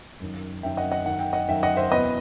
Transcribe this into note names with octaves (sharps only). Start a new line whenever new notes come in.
F#2 D#3
F#2 D#3 E5 G5
D#5 F#5
D#5 F#5
F#2 D#3 F#5
G5
D#5 F#5
F#2 D#3 E5 G5
D#5 F#5
C5 E5
E2 B2 B4 D#5